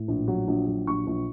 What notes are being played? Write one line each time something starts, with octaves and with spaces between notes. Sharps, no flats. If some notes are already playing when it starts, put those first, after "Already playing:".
Already playing: A2
A#1
F#3
A#1
F#3
A#1 C#6
A#1